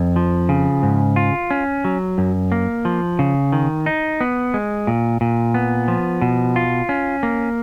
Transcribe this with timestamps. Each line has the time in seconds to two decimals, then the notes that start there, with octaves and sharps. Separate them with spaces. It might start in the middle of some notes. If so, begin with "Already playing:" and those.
Already playing: F2
0.16 F3
0.49 C#3
0.83 G#2
1.16 F4
1.51 C#4
1.85 F#3
2.18 F#2
2.52 A#3
2.85 F3
3.19 C#3
3.52 D#3
3.86 D#4
4.21 B3
4.54 G#3
4.87 A#2
5.21 A#2
5.54 B3
5.88 F3
6.22 B2
6.56 F4
6.89 C#4
7.23 A#3